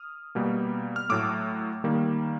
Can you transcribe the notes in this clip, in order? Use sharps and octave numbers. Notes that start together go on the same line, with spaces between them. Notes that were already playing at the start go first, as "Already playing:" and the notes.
Already playing: D#6 F6
B2 G3 A#3
F6
A2 F#3 A3 D6 E6
D#3 G3 A#3